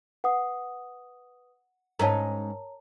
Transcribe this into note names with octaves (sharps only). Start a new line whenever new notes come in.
B4 F#5 D#6
G#2 C#4 D#4 A#4 C#5 A5 A#5